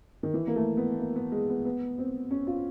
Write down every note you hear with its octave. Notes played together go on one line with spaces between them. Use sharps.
D#3
E3
A#3
A3
B3
A#3
B3
G#3
B3
B3
C4
C#4
F4